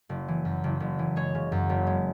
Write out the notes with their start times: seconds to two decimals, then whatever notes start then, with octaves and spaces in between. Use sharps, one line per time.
0.09 F#1
0.28 E3
0.45 F#2
0.64 F#1
0.80 F#1
0.99 E3
1.16 G#3 C#5
1.35 C#3
1.52 F#2
1.69 F#1
1.87 G#3